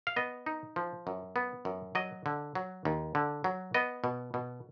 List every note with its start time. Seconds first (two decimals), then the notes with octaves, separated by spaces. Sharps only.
0.07 F5
0.16 B3 D#5
0.46 D#4
0.76 F3
1.07 F#2
1.36 B3
1.65 F#2
1.95 F#3 D#5
2.26 D3
2.55 F#3
2.85 D#2
3.15 D3
3.44 F#3
3.74 B3 D#5
4.04 B2
4.34 B2